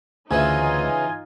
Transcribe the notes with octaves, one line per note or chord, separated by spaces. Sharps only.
D2 C#3 E3 D#4 F4 D#5 G#5